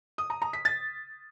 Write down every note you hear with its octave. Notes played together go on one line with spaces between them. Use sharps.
D#6
A#5
A#5
B6
A6